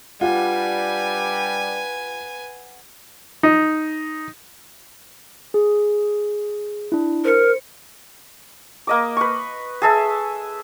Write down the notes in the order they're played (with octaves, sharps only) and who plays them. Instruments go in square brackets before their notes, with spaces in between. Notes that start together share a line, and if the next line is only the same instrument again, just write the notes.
[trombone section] G3 D4 G4 [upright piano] F4 [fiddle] B4 G#5 [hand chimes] F#5
[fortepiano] D#4
[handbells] G#4
D4 E4
[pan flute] A#4 [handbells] C5 C#7
[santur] A#3 D#5 D6
B4 C#6
G#4 A4 E5